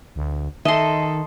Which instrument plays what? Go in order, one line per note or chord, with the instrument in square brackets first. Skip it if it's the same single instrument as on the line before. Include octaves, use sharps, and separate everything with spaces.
[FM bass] D2
[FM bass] D#3 [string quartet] A4 [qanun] D#5 C6 [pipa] E5